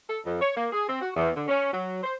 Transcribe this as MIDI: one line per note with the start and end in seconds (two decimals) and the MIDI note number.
0.09 0.20 69
0.25 0.39 41
0.41 0.55 73
0.56 0.68 58
0.73 0.86 68
0.88 1.00 60
1.02 1.11 66
1.16 1.30 40
1.36 1.46 50
1.48 1.70 61
1.73 2.01 54
2.04 2.15 72